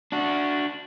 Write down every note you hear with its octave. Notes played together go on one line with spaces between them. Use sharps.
D4 F#4